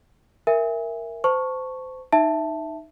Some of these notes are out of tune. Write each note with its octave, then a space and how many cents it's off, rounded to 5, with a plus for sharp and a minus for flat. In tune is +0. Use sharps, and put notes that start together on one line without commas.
A#4 +0 E5 +10 G#5 -20
C5 -25 A5 +15 C#6 -5
D#4 -10 E5 +0 A5 +0